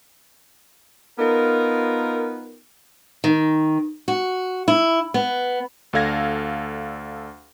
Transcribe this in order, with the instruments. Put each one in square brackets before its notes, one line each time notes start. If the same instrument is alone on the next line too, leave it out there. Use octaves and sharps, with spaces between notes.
[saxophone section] B3 D#4 F4 A#4
[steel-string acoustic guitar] D#3
F#4
E4
B3
[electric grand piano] D2 D4 A4 F5 G#6 A#6